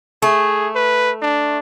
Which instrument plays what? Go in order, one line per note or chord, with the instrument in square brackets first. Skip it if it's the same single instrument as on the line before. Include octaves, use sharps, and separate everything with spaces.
[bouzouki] A3 [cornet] G#4
[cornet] B4
D4